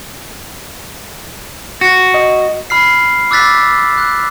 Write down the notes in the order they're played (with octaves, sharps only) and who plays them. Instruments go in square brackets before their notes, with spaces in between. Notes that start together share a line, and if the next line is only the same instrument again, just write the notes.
[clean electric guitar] F#4
[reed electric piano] D#5
[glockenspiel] B5 F6 C7
D6 E6 F#6 A6 B6
F#6